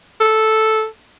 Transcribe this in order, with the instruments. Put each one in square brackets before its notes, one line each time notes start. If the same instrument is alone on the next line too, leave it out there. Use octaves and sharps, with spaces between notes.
[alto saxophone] A4